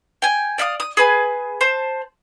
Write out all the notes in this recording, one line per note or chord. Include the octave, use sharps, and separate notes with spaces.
G5 G#5
D5 E5 F5 D#6
D#6
G#4 B4 G#5
C5 A5